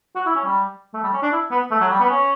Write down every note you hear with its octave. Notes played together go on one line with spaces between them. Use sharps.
F#4
E4
C#4
G3
A3
G3
C#4
D4
E4
B3
A3
F#3
G3
B3
C#4